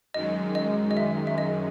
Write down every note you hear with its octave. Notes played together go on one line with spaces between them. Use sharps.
F#2 D#3 G#3 D#5
D#5
D#5
E5
E5
D#5